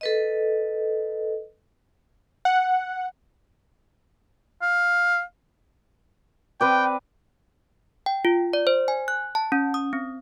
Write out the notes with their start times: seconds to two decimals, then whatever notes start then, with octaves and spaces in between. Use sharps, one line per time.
0.01 A4 B4 D#5
2.45 F#5
4.62 F5
6.61 C4 B4 D5 G5
8.06 G5
8.25 F4
8.53 D5
8.67 C5
8.88 G#5
9.08 F#6
9.35 A5
9.52 C#4
9.74 D#6
9.93 C4